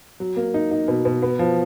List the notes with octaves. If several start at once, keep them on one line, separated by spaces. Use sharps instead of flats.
F#3
A#3
D#4
D#4
B2
B2
B3
F3